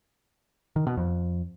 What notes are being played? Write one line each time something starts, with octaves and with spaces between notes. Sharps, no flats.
D#3
B2
F2